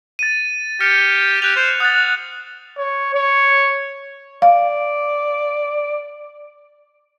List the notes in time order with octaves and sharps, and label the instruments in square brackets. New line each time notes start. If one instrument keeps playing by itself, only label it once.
[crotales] A6 D#7
[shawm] G4 [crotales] F6 A6 C#7
[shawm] G4 [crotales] F#6 F7
[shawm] C5
[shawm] F#5 [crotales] D#6 A6
[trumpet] C#5
C#5
[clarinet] D5 [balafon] F5